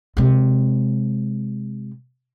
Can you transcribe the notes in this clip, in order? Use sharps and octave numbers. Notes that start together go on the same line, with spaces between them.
C3 G#3